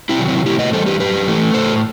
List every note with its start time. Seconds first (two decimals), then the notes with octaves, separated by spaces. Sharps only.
0.09 C4 E4
0.19 C3 D#3 F#3
0.28 C4 E4
0.46 A2 E4 G4
0.59 B4 D#5
0.73 E3 G3 A4 C5
0.86 G4 B4
0.99 F#2 G4 B4
1.27 E3 A3
1.54 A2 A4 C5